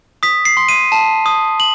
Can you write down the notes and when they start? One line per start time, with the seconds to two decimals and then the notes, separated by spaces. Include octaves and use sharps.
0.23 D#6 B6
0.45 C7
0.57 C6
0.69 D#7
0.92 A5
1.26 D#6
1.60 F#7